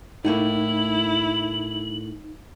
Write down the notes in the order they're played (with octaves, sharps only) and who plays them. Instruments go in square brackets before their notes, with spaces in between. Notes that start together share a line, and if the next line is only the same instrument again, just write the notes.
[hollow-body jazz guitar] A2 A3 A#3 [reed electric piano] D#4 [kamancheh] E4 [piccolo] F#7